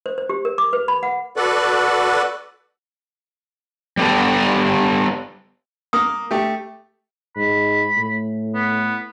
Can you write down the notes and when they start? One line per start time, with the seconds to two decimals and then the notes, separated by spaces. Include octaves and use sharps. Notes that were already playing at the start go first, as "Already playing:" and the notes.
0.06 C5
0.18 C5
0.29 G4
0.45 A#4
0.58 D6
0.73 B4
0.88 B5
1.03 F#5
1.37 F#4 A4 B4 D5 F#5
3.97 G3 B3 G4 A4 D5
5.93 A#3 D#6
6.31 A3 G4
7.36 G#2 B5
7.97 A2
8.55 B3